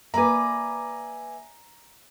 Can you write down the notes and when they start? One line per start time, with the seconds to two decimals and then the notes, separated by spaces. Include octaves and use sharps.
0.14 A#3 B4 D5 E5 G#5 A#5